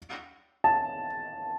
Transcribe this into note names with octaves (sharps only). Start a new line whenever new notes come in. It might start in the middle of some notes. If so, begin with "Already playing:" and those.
A5